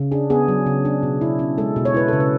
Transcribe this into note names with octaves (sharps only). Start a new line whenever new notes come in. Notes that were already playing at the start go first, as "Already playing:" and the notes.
Already playing: C#3
D4 G#4
B3 G#4
F#3
C#3
D4
B2
E4
C#4
G#3 A4
B2
C#5
E4 B4
C#3 A4
B4